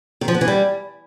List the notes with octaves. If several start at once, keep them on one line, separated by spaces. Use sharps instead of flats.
D#3
F3
B3
E3
G3